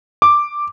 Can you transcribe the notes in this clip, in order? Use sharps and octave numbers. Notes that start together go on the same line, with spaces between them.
D6